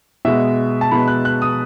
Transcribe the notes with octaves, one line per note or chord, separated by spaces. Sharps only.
B2 G#3 B3 E5
A5
B2 G#3 B3 B5
F#6
F#6
D#6